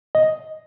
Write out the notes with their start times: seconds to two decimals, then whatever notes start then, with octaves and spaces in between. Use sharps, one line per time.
0.15 D#5